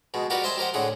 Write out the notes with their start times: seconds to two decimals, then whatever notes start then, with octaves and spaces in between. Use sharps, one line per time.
0.14 B2 G#3
0.30 F#4 G4 A#4 B4 D5 F#5
0.44 C5 D#5 E5 G#5 A5 C6
0.58 G4 A#4 C5 F#5
0.74 A2 D3 G#4 F#5